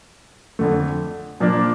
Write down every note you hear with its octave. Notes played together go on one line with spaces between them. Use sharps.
F2 D3 A3
A#2 F3 A#3 D4